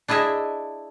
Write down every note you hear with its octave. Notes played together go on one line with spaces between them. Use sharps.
D4 E4 G#4 D#5 E5